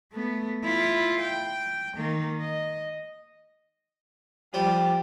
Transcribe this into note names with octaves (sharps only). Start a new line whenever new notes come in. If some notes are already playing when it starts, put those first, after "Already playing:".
A3 B3
E4 F4
G5
D#3 A#3
D#5
F3 G3 G4